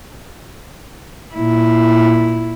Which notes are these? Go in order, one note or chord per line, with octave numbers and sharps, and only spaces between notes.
A#2 E4